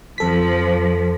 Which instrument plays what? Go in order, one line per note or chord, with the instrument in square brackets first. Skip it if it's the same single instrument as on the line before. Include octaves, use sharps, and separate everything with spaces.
[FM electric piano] F2 A4 B6 [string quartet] F3